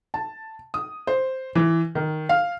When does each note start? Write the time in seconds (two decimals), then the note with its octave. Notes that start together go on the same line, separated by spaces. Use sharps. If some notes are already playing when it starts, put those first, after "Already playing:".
0.14 A5
0.74 D#6
1.07 C5
1.55 E3
1.95 D#3
2.29 F5